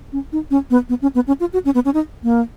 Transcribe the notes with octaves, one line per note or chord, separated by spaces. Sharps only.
C#4
D#4
C#4
B3
B3
C#4
B3
C#4
F4
F#4
C#4
B3
C#4
D#4
A#3